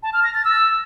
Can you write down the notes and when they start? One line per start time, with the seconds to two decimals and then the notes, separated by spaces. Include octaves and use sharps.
0.03 A5
0.13 F6
0.24 A#6
0.34 A6
0.45 E6